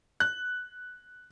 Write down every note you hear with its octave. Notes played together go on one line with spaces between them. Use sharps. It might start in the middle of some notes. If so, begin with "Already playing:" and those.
F#6